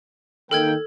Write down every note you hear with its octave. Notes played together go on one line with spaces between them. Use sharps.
D#3 A#3 A4 G5 F6 G#6